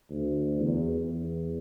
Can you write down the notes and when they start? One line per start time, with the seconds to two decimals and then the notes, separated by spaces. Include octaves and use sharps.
0.10 D2
0.60 E2
0.95 E2